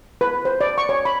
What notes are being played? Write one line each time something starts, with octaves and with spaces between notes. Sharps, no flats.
B4
C5
D5
C#6
C#5
B5